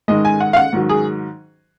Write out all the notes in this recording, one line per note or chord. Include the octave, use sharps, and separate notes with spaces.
G#2 D#3 G#3 D#5
G#5
F#5
F5
F#5
G#2 D#3 F#3
G#4